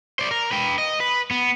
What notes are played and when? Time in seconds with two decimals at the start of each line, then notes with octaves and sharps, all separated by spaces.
0.19 C5 D5
0.31 A#4
0.52 B4 G5
0.78 D#5
1.00 B4
1.31 B3